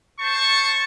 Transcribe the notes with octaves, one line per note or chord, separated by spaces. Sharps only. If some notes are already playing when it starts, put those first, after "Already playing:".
C5 A5 C#6